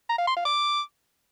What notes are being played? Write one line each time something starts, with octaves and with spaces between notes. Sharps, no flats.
A#5
F5
C6
F5
D6